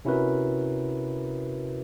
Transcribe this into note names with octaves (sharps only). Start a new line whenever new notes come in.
C3 C#4 E4 F#4 A#4 B4